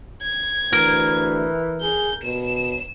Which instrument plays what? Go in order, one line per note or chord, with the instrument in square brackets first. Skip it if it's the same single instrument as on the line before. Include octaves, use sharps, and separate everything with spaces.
[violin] G#6
[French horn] D2 [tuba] E3 [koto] A#4
[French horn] G#4 [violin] G6
[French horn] B2 [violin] E7